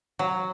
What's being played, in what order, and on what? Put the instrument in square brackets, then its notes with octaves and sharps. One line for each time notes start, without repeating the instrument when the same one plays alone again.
[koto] F#3